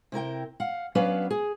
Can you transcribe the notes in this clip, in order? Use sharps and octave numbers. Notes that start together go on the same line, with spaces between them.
C3 E4 A#4 G5
F5 F#5
F#3 B3 C#4 D4 B4 F5
G#4